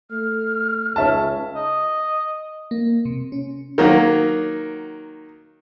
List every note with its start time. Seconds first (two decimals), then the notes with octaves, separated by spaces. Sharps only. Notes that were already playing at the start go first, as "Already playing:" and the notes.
0.11 A3 F6
0.96 C#2 C#5 E5 A5
1.55 D#5
2.71 A#3
3.05 C3
3.32 C#4
3.78 D#3 F#3 A#3